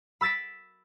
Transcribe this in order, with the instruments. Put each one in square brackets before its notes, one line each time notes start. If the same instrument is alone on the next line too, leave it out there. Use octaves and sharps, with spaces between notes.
[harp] B5 E6 A6 B6 D7